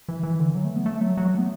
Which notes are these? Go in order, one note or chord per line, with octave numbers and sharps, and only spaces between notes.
E3
E3
D3
F#3
A3
B3
A3
F#3
F#3
A3
B3